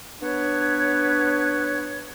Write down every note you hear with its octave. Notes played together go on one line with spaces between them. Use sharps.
B3 D4 B4 C#5